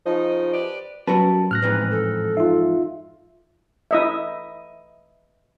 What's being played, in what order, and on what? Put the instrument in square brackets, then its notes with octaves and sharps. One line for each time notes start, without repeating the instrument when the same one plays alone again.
[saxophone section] C#3 D#4 [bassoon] F3
[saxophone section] G4 B4 D5
[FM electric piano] F#3 [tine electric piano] G3 C#4 A5 [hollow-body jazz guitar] F#4 A#4 B4
[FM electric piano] A2 [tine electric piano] F6 F#6 A#6
[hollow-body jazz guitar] F2 G#2 E3 [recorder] B4
[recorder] A4
[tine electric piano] D#4 F4 [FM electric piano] E5
[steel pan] E4 D#5 E5